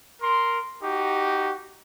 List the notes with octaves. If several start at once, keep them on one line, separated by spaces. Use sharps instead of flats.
A#4 C6
D#4 F#4 G4